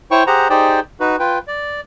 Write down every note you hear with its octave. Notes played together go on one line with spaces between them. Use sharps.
E4 C5 C#5 G5 C#6
G4 G#4 C5 F#5 A#5
D#4 G4 G#4 C5 D5 G5
D#4 F#4 B4
F4 B4 G5
D5